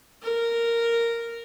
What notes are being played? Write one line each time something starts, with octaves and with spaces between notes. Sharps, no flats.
A#4